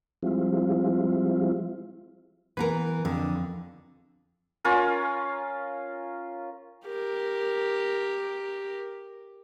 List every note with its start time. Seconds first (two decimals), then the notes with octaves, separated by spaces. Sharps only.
0.23 F3 G3 G#3 C4 E4 F4
2.57 E3 B3 A#4 B4 A#5
3.05 F2 D3
4.64 C#4 F4 A#4
6.86 G4 A#4